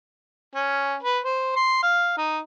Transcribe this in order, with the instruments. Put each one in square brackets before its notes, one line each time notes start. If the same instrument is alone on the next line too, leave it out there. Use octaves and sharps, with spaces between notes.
[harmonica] C#4
B4
C5
C6
F5
D#4